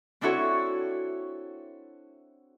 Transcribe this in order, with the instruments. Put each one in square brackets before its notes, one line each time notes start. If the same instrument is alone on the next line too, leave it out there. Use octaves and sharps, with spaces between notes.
[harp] C4 D4 E4 F#4 A4 C#5